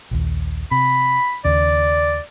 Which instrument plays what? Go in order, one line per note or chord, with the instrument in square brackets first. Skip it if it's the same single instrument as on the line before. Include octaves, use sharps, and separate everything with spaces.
[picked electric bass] A#1 D#2
[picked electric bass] C3 [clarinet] B5
[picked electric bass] D#2 C#3 [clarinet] D5